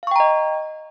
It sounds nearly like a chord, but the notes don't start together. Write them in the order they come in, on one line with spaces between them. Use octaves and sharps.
F5 C#6 G5 A#5 D#5